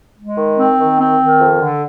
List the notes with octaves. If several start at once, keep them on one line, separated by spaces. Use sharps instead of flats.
G#3
D#3
C4
D#3
C4
D#3
F2
D3